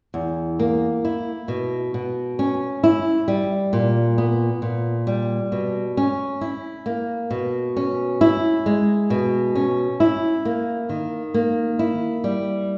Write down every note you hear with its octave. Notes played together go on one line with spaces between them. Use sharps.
E2
A#3
E4
B2
B2
C#4
E4
G3
A#2
B3
A#2
G3
B2
C#4
E4
A#3
B2
C#4
E4
G#3
B2
C#4
E4
A#3
D#3
A#3
E4
G3